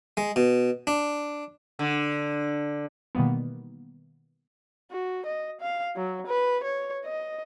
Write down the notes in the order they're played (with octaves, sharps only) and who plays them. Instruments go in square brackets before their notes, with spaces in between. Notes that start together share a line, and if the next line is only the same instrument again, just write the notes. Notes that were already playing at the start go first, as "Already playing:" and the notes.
[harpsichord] G#3
B2
D4
[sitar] D3
[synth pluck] B2 D#3 E3 G3 A#3 B3
[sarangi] F#4
D#5
F5
F#3
B4
C#5
D#5